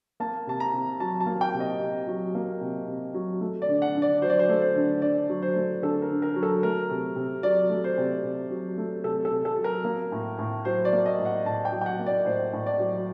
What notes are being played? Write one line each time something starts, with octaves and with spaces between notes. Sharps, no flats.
A#3 A5
C3 A5
A#5
C3
F#3 A5
A5
A#3
G5
C3
D#5
C3
F#3
A#3
C3
C3
F#3
A3
D5
D3
F#5
D3
D5
F#3 C5
D5
C5
A3
C5
D3
D3 D5
F#3
C5
A3
D3 A4
A#4
D3
A#4
F#3
A4
A3 A#4
C3
C3
F#3 D5
A3
C5
C3
C3
F#3
A3
C3 A4
A4
C3
A4
F#3
A#4
A#3
A2
A2
F#3 C5
D5
A#3
D#5
A2
F#5
A2 A5
G5
F#3
G5
F#5
A#3
D5
A2 C5
A2
D5
F#3